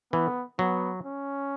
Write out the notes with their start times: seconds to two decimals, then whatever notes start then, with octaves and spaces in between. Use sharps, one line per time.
0.13 E3 B3
0.59 F#3 B3
1.05 C#4